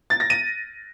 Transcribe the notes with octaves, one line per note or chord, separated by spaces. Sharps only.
A6
A#6
D#7